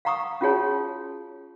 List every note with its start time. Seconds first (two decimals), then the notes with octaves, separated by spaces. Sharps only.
0.05 F5 F#5 A#5 C#6 D#6 E6
0.41 C#4 F4 F#4 G#4 C#5 A5